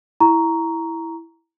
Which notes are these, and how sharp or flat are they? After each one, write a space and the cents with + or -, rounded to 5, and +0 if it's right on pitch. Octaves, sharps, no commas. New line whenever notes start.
E4 +0 A#5 +0 C#6 +15